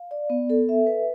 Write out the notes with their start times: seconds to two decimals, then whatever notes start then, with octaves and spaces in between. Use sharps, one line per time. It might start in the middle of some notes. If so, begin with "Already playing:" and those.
Already playing: F5
0.11 D5
0.30 B3
0.50 A4
0.69 E5
0.87 B4